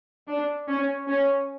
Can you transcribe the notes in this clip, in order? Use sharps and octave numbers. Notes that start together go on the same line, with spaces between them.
D4
C#4
C#4